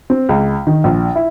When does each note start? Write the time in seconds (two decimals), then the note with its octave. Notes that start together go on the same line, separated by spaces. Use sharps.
0.10 C4
0.29 C#2
0.67 D#3
0.84 A#1
1.15 E4